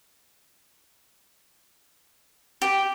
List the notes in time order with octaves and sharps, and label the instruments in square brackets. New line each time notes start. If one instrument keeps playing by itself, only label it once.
[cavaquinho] G4